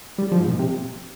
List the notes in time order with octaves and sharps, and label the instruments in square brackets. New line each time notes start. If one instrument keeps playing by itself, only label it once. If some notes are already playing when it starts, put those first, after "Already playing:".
[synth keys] G3
F3
G#2
A#2
C3